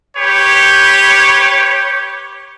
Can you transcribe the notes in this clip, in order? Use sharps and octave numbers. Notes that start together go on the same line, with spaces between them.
G4 B4 C#5